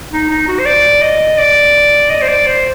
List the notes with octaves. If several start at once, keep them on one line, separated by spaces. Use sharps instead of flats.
D#4
D#4
F#4
C5
D5
D#5
D5
D#5
C5
D5
C5